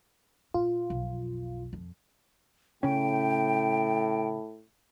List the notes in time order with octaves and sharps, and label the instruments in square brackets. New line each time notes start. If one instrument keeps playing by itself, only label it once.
[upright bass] A#2 [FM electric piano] F4
[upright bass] B1 F2
F2
[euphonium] A2 [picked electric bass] C#3 C#4 [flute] G5